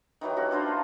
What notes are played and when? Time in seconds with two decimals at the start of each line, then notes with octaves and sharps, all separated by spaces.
0.21 D#3 E3 F#3 G4
0.36 C#4 F#4 A4
0.51 D4 F4 B4 C5
0.68 A#3